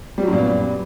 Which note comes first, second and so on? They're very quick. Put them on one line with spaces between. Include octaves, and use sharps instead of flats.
G3 F#3 F#2 A#2 B3